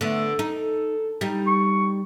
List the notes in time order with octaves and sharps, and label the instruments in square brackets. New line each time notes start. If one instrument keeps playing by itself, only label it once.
[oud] D3 B3 [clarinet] A3
[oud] D#4 [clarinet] A4
[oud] G3 D#4
[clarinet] C#6